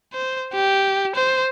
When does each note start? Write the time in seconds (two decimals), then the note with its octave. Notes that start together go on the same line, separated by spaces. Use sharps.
0.14 C5
0.54 G4
1.16 C5